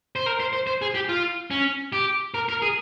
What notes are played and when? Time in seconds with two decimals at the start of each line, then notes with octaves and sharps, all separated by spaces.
0.16 C5
0.26 A#4
0.40 C5
0.53 C5
0.67 C5
0.82 G#4
0.95 G4
1.09 F4
1.51 C#4
1.93 G4
2.34 A#4
2.49 A#4
2.62 G#4